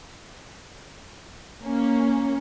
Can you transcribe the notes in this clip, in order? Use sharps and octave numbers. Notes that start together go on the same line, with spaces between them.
A#3 C#4